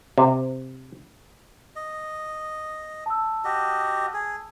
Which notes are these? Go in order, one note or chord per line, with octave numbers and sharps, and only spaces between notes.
C3
D#5
A5 E6
F#4 G4 D#5
G#4